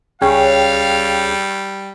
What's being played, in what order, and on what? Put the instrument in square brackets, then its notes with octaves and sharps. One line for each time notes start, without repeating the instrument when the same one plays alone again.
[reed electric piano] C#2 G#4 G5 [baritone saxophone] G3 [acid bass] C#4 [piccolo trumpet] F5